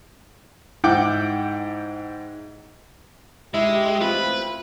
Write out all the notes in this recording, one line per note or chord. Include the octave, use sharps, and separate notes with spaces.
G#2 E4 F#5 G5 D6
D2 G#3 E4 G4
A1 A3 C4 F4 B4